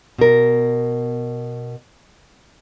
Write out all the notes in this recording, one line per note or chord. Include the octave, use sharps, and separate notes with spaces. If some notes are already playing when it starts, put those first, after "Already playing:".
B2 A#4